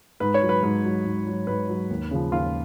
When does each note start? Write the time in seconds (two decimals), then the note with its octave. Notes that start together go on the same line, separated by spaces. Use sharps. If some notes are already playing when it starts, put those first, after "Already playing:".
0.20 G#2 B4
0.34 C#5
0.42 F#3
0.49 B4
0.63 G#2 B4
0.85 F#3
1.05 G#2
1.27 F#3
1.47 G#2 B4
1.69 F#3
1.90 D#2
2.11 C#3 F3
2.32 D#2 F4